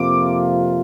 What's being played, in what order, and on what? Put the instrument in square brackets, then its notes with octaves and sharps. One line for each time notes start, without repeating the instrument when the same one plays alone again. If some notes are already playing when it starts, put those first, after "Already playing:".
Already playing: [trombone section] F2 C3 F3 A#3 F4 [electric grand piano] D6